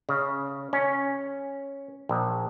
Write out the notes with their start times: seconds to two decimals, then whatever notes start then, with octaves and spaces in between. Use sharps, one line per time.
0.09 C#3
0.73 C#4
2.09 A#1